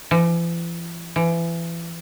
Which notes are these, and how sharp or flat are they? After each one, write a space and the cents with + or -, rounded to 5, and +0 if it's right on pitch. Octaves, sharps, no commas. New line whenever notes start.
E3 +45
E3 +30